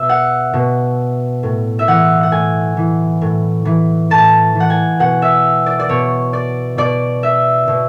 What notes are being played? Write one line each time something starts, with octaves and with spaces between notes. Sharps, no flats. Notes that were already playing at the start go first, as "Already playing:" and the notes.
Already playing: B2 E5
F#5
B2
A2
E5
E3 F#5
F#5
A2 G#5
E3
A2
E3
A2 A5
E3
F#5
G#5
B2 F#5
E5
D5
D5
B2 C#5
D5
B2 D5
E5
B2